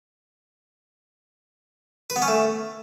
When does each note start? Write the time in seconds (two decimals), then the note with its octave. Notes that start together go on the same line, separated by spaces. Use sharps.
2.10 B4
2.16 B3
2.22 C#4
2.28 A3